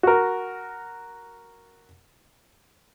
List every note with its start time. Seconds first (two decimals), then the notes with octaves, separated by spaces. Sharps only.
0.03 F#4 A#4